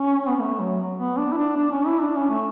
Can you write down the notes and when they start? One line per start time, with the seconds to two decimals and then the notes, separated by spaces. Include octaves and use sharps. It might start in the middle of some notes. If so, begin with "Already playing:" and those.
Already playing: C#4
0.28 B3
0.40 A3
0.59 F#3
0.97 B3
1.17 D4
1.32 E4
1.37 D4
1.56 D4
1.71 C#4
1.86 E4
2.01 D4
2.15 C#4
2.30 A3